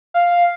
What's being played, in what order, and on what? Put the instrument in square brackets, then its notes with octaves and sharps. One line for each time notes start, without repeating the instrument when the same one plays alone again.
[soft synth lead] F5